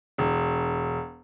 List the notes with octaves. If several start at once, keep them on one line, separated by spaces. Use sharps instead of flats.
E1